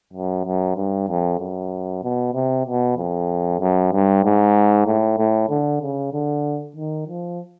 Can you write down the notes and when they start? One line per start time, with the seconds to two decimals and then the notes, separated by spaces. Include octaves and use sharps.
0.13 F#2
0.45 F#2
0.76 G2
1.08 F2
1.39 F#2
2.03 B2
2.34 C3
2.66 B2
2.97 F2
3.60 F#2
3.92 G2
4.24 G#2
4.86 A2
5.18 A2
5.49 D3
5.82 C#3
6.13 D3
6.76 D#3
7.08 F3